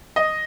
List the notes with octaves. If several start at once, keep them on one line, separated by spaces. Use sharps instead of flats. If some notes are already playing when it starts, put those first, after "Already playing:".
D#5